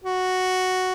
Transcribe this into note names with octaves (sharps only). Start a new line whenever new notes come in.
F#4